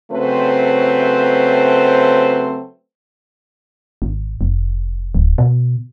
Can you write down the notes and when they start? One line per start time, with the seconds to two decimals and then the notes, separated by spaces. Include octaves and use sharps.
0.12 C#3 F#3 A3 C4 B4 C5
4.02 G#1
4.41 F1
5.15 D1
5.38 B2